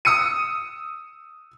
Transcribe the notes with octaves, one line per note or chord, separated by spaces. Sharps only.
D#6 E6 C#7 D#7